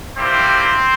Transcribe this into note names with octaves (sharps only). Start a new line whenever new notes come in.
G3 A#3 C4 E4 G4 C5